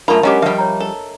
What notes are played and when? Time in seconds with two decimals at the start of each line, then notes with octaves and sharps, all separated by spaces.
0.08 F#2 A3 D4 F4 A#4 A#5 B5
0.23 F#3 G#3 C#4 G4 D#5
0.42 F3 G3 E5 F5 G5
0.58 C#5 A#5
0.80 A4